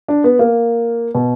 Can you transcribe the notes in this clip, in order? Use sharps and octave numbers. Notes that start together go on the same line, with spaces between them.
D4
B3
A#3
B2